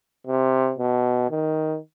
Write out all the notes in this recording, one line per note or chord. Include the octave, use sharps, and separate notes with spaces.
C3
B2
D#3